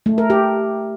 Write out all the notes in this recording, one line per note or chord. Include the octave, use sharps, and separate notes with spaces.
A3
A#4
G4